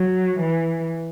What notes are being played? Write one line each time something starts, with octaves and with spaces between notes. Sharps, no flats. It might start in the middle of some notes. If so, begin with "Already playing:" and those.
Already playing: F#3
E3